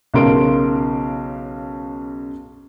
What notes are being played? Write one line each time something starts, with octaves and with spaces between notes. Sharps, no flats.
B1 C#3 A#4 C6 D7